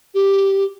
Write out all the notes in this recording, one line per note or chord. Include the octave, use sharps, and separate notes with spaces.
G4